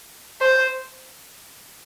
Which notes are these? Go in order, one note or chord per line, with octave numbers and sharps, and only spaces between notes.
C5